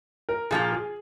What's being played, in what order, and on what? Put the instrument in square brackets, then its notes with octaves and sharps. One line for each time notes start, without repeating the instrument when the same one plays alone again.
[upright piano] A#4
[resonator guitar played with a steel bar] A#2 F3 A#3 F4 [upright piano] G#4
[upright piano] G#4